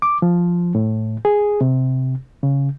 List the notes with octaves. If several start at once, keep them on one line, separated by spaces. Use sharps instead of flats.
D6
F3
A2
G#4
C3
C#3